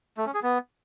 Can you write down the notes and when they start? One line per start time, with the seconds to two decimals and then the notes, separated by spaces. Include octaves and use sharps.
0.17 A3
0.26 C#4
0.34 G#4
0.43 B3